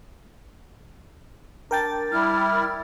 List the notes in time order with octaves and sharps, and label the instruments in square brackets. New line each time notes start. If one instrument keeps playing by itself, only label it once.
[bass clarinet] D4 [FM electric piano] A#4 G5 A6
[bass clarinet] G3 [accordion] E4 [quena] F6